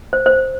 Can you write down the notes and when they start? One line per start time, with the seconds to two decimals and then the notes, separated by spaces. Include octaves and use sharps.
0.13 C5
0.26 C5